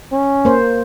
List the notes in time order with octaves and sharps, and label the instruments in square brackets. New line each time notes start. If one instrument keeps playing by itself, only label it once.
[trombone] C#4
[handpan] A#3 C5